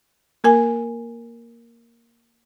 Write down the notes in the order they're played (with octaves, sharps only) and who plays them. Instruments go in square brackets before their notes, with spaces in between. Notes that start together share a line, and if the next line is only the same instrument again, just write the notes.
[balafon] A#3 A#4 G#5